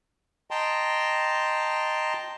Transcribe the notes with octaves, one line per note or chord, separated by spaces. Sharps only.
D#5 G5 A5 A#5 C6